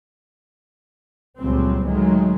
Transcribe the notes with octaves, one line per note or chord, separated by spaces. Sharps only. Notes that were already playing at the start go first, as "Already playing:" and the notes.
C#2 A#2 F#3 G3 C4
A2 D#3 F#3 G#3